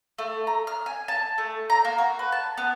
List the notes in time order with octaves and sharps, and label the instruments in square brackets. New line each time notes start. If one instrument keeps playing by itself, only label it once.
[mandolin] A3
A#5
F6
G#5
A5
A3
A#5
A#3
F#4
B4
A5
B3